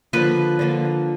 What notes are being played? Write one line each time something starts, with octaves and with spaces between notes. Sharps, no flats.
D3 F3 A#3 B4
D3 F3 A#3